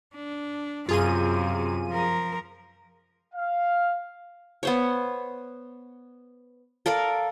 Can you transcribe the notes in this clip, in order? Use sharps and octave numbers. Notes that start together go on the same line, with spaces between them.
D4
F#2 C3 F4 G#4 D#7
F3 A#4
F5
B3 C5 C#5
A4 A#4 D5 F5